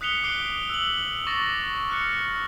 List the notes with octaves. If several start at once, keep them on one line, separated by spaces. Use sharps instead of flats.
D#6 F#6 B6 C#7 F7 G7
D6 F#6 C7 D7 G7
E6 F#7
C#6 D6 A6 A#6
F6 F#6 C#7